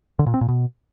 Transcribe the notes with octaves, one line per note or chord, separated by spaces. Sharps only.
D3
A#2
C4
A#2
B2